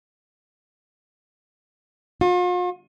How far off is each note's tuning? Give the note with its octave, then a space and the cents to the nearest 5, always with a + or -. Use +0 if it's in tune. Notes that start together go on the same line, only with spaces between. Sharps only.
F4 +45